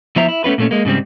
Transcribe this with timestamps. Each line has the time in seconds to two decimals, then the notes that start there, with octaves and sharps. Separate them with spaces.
0.16 F3 B3 E4 C5 E5 A#5
0.28 E4
0.44 A3 B3 C#4 F4 B4
0.58 A#2 A3 C#4
0.71 G#3 A#3
0.85 G#2 C#3 G3 C4